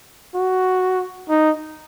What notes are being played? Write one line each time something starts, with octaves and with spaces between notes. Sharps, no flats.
F#4
D#4